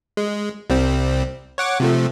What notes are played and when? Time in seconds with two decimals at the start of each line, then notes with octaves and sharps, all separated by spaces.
0.17 G#3
0.70 C2 G3 C4
1.58 C#5 F#5 D6
1.80 C3 F3 A3